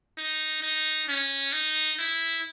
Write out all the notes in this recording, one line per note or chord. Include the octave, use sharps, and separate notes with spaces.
D#4
D#4
C#4
D#4
E4